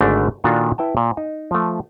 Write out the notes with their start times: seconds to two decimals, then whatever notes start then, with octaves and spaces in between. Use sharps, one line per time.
0.01 G#1 G#2 D3 A3 D4 D5
0.44 A#2 D#3 D4 F4 F#4 A4
0.78 E4 B4 G5 A5
0.97 A#2
1.17 D#4
1.51 F3 A3